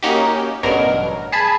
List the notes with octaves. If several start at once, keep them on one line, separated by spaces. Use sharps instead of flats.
A#3 C#4 D#4 F#4 G4
A1 G2 B2 F#3 A#4
G#4 A5 B5 G#6